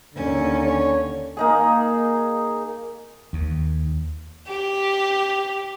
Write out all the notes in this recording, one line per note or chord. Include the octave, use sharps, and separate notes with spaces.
D#2 D3 C#4
C#5
A#3 D#4 G#4
D#2
G4